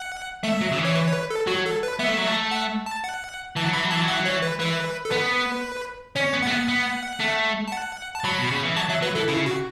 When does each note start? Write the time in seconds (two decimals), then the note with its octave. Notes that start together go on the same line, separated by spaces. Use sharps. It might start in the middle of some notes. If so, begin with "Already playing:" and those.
Already playing: F#5
0.43 A3 E5
0.61 F#3
0.71 C#3
0.78 E3
0.85 C#5
0.95 B4
1.08 C#5
1.13 B4
1.30 A4
1.47 F#3 F#4
1.66 A4
1.83 B4
1.99 B3 E5
2.09 A3
2.18 F#3
2.27 A3
2.51 F#5
2.86 A5
3.04 F#5
3.56 E3 A5
3.65 F#3
3.73 E3 B5
3.84 F#3
3.91 E3 A5
4.02 F#3
4.08 E3 F#5
4.20 F#3
4.26 E3 C#5
4.42 B4
4.60 E3 B4
5.05 A4
5.11 B3 B4
6.16 C#4 C#5
6.34 B3
6.42 A3 F#5
6.51 B3
6.68 B3
7.20 A3
7.68 A5
7.72 F#5
8.15 A5
8.24 F#3 B5
8.39 B2
8.51 C#3
8.63 E3
8.77 F#3 A5
8.90 F#3 E5
9.02 F#3 B4
9.15 E3 A4
9.28 C#3 E4
9.46 F#4